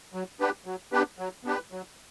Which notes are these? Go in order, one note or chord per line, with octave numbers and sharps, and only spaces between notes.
F#3
B3 D4 G4 B4
F#3
B3 D4 G4 B4
F#3
B3 D4 G4 B4
F#3